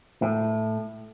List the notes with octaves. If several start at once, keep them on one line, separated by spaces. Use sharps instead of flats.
A2